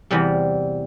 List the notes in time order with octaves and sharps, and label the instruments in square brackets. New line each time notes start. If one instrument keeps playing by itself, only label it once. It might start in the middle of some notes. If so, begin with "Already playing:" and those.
[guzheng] E2 C3 G3